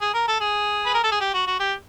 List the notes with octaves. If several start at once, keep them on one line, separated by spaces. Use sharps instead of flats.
G#4
A#4
A4
G#4
B4
A#4
A4
G#4
G4
F#4
F#4
G4